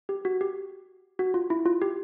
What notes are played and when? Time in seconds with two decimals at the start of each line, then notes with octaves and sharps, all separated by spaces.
0.09 G4
0.25 F#4
0.41 G4
1.19 F#4
1.34 F4
1.50 E4
1.66 F4
1.82 G4